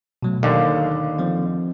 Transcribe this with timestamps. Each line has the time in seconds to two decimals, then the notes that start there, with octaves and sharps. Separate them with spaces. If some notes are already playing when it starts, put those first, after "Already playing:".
0.23 B2 F#3 A3
0.43 D#2 D3 A#4 F5
1.19 F3 C4